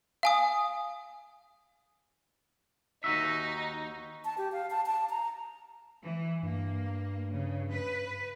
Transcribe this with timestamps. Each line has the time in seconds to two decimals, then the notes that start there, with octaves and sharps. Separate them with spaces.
0.23 F5 G#5 D#6
3.04 D#2 D#4 F#4 E5
4.25 A5
4.38 G4
4.53 F5
4.70 A5
4.87 A5
5.09 A#5
6.02 E3
6.43 G2 A#3
7.33 C#3
7.72 B4